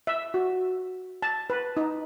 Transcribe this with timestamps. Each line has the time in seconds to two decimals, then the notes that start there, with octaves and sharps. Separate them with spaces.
0.07 E5
0.34 F#4
1.22 A5
1.50 B4
1.77 D#4